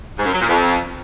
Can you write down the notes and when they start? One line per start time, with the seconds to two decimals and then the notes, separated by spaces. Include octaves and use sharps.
0.17 G#2
0.25 F#2
0.33 F#3
0.40 A#2
0.48 F2